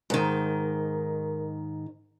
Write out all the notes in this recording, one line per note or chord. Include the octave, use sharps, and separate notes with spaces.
G#2 D#3 A#4